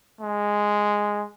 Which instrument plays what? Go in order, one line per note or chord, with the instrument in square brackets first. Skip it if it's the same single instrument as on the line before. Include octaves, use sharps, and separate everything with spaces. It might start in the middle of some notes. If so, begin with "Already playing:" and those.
[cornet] G#3